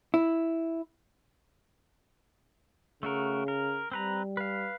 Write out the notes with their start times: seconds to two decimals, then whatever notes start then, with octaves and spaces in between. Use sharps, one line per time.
0.14 E4
3.03 C#3 A3 F#4 A#4
3.48 A#4
3.92 G3 C4 B4 A#5
4.37 B4 F5